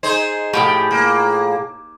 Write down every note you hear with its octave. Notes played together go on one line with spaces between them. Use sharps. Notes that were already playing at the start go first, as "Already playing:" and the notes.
D#4 G#4 C5
A2 F3 G4 G#4
A#3